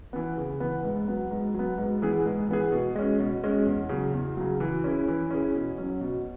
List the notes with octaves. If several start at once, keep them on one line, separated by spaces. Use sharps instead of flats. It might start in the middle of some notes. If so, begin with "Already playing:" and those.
E3 B3
C#3
E3 B3
G#2
F#3 B3
G#2
F#3 B3
G#2
E3 B3 G#4
G#2
E3 B3 G#4
B2
G#3 C#4
B2
G#3 C#4
E2
C#3 F#3
E2
C#3 F#3
E3
C#4 E4 G#4
E3
C#4 E4 G#4
B2
F#3 C#4
B2